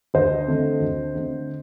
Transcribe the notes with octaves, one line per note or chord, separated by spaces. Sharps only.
D2 C5 D#5
D3 A3 C4
D2
D3 A3 C4